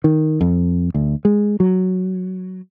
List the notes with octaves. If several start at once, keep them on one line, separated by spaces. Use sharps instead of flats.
D#3
F2
D2
G#3
F#3